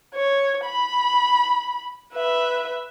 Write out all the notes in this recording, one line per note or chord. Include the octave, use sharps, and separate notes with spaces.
C#5
B5
B4 E5